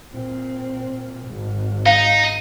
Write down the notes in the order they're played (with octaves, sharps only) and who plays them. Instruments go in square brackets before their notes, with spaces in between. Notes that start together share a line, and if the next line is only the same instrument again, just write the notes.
[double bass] A#2 C4
G#1
[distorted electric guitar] D#4 [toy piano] F5